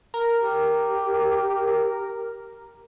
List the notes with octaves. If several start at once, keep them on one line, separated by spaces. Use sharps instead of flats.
A#4
G4